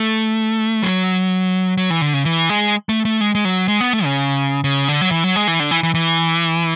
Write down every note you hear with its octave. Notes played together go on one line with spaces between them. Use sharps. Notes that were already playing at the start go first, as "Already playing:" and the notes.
Already playing: A3
F#3
F#3
E3
D3
C#3
E3
G#3
A3
A3
G#3
G#3
F#3
G#3
B3
A3
C#3
C#3
D3
F#3
E3
F#3
G#3
E3
D3
E3
E3
E3